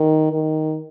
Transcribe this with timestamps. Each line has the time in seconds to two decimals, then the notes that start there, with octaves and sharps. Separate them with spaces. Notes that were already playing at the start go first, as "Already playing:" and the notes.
Already playing: D#3
0.32 D#3